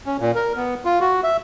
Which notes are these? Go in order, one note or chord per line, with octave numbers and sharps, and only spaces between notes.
C#4
A#2
A#4
B3
F4
F#4
E5